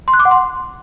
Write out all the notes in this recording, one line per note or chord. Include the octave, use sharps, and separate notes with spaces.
C6
F#6
D6
F#5
C6